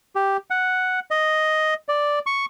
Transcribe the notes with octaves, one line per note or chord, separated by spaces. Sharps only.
G4
F#5
D#5
D5
C#6